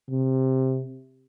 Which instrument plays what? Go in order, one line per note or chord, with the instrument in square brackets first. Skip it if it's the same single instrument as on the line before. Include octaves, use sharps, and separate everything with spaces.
[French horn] C3